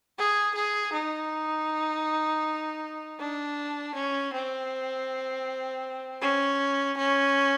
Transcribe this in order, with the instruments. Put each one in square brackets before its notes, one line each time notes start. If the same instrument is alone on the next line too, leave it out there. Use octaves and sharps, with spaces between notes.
[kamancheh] G#4
G#4
D#4
D4
C#4
C4
C#4
C#4